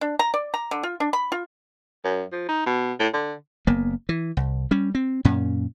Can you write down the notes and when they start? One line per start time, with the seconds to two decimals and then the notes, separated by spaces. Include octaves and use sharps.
0.01 D4
0.19 A#5
0.34 D5
0.54 A#5
0.71 D3
0.83 F4
1.00 D4
1.13 B5
1.32 F4
2.04 F#2
2.32 F3
2.49 D#4
2.66 B2
3.00 A2
3.14 D3
3.67 F#1 A#3 B3
4.09 E3
4.37 C2
4.71 G3 C#4
4.95 C4
5.25 F#2 A#2 C#4